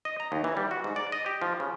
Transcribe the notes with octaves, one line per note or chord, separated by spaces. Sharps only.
D#5
A#5
D#2
E3
G3
F#4
G#2
D5
D#5
G4
F3
C#3